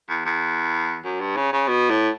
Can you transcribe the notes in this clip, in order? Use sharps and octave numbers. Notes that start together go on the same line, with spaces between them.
E2
E2
F#2
G2
C#3
C#3
B2
A2